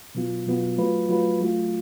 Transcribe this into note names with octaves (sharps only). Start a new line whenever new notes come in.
B2 F#3 B3 F4
B2 F#3 B3 F4
F#3 A3 F4 B4
F#3 A3 F4 B4
F#3 A3 F4